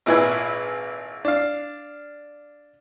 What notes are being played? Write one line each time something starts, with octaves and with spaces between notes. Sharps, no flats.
G#1 A#2 E4 B4 G#5 E6
D4 F5